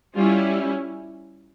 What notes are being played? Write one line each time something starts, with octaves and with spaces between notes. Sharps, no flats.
G3 C#4 E4 F4